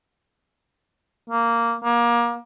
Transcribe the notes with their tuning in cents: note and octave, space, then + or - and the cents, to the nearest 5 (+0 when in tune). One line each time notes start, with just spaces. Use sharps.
A#3 -5
A#3 +25